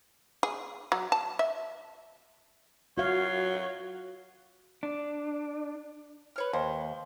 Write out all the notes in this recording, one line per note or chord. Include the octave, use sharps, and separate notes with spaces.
G#4
F#3
A5
E5
F#3 F#4 F5
D4
B4 C#5 F6
D#2 C5